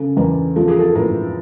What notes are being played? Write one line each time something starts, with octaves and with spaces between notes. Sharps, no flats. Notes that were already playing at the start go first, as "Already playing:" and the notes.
Already playing: C#3 A4
E2 A#4
F3 A4
G#4
A4
A2 A#4